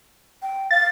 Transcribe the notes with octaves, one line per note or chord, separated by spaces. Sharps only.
G5
F5 A6